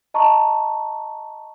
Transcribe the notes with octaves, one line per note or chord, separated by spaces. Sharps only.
D#5 A5 A#5 C#6